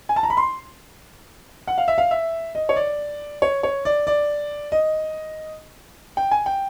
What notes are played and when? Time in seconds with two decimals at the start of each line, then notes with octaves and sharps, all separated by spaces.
0.09 G#5
0.16 A5
0.23 A#5
0.30 B5
0.37 C6
1.67 F#5
1.78 F5
1.88 E5
1.98 F5
2.11 E5
2.55 D#5
2.69 C#5
2.76 D5
3.42 C#5
3.63 C#5
3.85 D5
4.07 D5
4.72 D#5
6.17 G5
6.31 G#5
6.46 G5